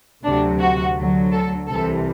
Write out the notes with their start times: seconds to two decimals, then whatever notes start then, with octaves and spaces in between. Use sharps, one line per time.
0.24 D2 C3 F#3 D4
0.60 F#4
0.96 D2 D3 F#3
1.32 A4
1.67 C2 C3 E3 G3 A4